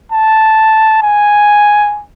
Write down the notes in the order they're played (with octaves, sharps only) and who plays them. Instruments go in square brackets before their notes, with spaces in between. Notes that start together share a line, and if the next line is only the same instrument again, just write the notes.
[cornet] A5
G#5